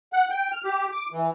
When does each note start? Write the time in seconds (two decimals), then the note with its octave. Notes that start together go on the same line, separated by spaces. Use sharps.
0.13 F#5
0.30 G5
0.52 F6
0.65 G4
0.92 D6
1.12 E3